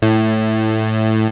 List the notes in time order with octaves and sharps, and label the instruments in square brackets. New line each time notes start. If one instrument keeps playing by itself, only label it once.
[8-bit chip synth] A2